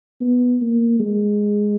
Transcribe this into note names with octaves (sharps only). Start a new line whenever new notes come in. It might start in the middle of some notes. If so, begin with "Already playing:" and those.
B3
A#3
G#3